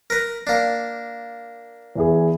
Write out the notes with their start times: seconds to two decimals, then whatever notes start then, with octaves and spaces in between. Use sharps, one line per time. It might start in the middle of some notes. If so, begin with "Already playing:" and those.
0.10 A#4 B4
0.47 A#3 D4
1.95 E2 E3 G#4